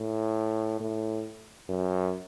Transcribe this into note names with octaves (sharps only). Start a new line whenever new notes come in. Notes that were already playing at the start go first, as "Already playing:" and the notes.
Already playing: A2
A2
F#2